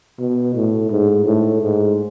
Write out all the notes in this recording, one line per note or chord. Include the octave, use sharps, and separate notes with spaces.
B2
A2
G#2
A2
G#2